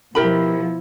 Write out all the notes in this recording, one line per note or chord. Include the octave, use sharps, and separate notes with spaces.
B2 F3 E4 G4 A#4 B5